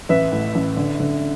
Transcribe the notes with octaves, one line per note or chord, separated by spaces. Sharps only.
A1 B4 E5
A2
A1
D3
D3